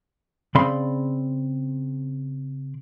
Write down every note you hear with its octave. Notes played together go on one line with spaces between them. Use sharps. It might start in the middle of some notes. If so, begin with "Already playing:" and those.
C#3 C4 D5 B5 C6